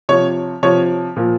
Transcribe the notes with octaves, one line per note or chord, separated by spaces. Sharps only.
C3 F3 C#5
C3 F3 C#5
A#2 F3